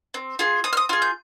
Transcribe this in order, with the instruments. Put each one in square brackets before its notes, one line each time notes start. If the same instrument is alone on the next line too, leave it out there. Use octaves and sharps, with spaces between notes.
[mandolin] C4
F4 G#4
C4 D#6
F6
D#6
F4 G#4 F6
G6